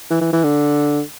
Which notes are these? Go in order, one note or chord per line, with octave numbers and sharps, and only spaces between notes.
E3
E3
E3
D3